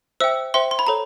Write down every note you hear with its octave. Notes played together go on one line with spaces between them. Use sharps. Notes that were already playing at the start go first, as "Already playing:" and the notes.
C5 E5 G5 E6
C5 E5 G5 C6
C6
B5
A4 C#5 A#5